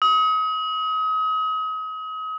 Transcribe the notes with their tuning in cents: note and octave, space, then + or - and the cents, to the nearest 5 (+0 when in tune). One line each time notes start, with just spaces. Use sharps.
D#6 +35